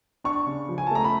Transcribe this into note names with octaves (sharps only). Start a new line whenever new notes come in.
D4 C#6
C#3
F3
G#5
A5
A3 A#5
B5